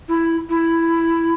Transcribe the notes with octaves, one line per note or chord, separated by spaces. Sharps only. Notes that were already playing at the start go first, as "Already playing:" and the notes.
E4
E4